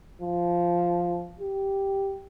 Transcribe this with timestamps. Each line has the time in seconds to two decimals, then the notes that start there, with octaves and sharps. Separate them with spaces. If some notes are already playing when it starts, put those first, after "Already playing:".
0.22 F3
1.40 G4